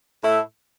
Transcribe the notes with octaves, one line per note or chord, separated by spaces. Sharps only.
A2 A3 E4